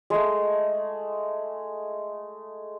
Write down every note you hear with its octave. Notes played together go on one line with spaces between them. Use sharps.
G#3 A3